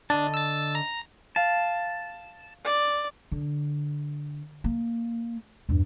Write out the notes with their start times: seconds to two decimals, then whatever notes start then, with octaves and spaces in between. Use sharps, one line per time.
0.10 D3 D4 D#5 A5
0.34 E6 A6
0.75 A#5
1.36 F5 A5
2.65 D5
3.32 D3
4.64 A#3
5.69 E2 G2